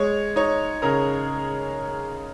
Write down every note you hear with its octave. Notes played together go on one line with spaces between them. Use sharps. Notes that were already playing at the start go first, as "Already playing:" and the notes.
Already playing: G#3 C#5
D#4 C#5
C#3 A#4